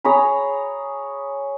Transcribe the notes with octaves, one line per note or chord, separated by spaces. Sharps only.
G#4 C#5 A#5 B5